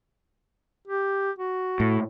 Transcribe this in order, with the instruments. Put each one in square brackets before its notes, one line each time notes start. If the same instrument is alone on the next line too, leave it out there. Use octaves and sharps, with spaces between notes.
[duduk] G4
F#4
[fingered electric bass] A2